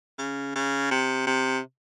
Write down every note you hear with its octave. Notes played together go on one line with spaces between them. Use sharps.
C#3
C#3
C3
C3